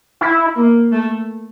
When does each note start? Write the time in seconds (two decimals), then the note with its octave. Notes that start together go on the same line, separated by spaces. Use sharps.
0.21 E4
0.57 A#3
0.92 A3